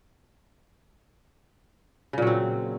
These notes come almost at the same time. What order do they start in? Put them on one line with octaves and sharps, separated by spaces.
C#3 A#2 F#3 C4